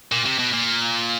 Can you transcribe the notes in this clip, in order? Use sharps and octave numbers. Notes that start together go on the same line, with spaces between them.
A#2
C3
B2
A#2